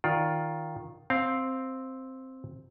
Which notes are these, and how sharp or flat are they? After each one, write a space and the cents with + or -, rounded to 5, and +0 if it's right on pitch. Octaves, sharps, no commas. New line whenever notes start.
D#3 +10 F4 +10 D5 +0
C4 +0 F5 +0